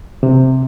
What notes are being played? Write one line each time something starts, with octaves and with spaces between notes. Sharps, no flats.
C3